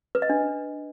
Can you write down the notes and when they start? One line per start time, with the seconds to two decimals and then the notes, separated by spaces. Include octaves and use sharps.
0.15 B4
0.22 D#5
0.30 D4